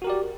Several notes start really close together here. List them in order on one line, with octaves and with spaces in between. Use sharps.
F#4 A#4 G4 D5